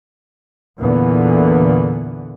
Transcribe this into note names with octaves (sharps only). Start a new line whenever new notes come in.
E2 A#2 D3 E3 B3